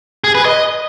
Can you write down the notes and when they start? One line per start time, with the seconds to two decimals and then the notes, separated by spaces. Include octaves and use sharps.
0.24 G#4
0.35 B4
0.45 D#5